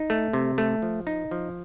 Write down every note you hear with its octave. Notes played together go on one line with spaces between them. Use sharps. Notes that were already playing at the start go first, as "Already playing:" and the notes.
Already playing: D#4
A3
C3
A3
F3
D#4
F3